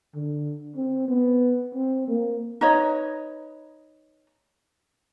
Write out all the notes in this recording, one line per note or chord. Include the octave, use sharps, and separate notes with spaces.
D3
C4
B3
C4
A#3
D#4 B4 C#5 D#5